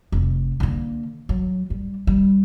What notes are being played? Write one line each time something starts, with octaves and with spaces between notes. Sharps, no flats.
F1
D3 A#3
F#3
G3
G3